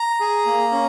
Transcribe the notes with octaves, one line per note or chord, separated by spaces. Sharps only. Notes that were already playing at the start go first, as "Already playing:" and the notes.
Already playing: A#5
G#4
A#3
C#4